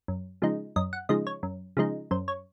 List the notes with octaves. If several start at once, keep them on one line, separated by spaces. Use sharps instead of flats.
F#2
C#3 F3 G#3 D#4
F#2 D#5
F#5
C#3 F3 G#3 D#4 D#5
C#5
F#2
C#3 F3 G#3 D#4
F#2 C5
C#5